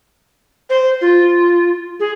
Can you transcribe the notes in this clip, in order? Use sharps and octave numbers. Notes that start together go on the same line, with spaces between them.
C5
F4
G#4